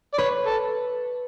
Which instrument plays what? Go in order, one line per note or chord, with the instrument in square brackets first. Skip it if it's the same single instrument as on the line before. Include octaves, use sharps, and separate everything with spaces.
[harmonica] D5
[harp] B4 [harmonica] C#5
[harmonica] A4